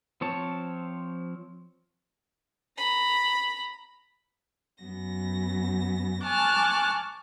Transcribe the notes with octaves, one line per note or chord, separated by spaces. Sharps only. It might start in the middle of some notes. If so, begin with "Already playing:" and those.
F3 C4 C#5 A5
A#5 B5
F#2 B3 A#6
G#5 A5 C#6 D6 F6 F#6